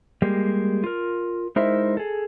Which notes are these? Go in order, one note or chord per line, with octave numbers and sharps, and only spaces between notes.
G3 G#3 A#3 G4
F4 A#4
G#3 D#4 E4 A#4 C5 E5
G#4 A4